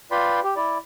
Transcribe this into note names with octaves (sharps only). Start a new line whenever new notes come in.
F4 B4 D5 G5 B5 C6
G4
E4 D5